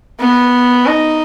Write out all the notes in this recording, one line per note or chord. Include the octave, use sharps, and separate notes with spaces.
B3
D#4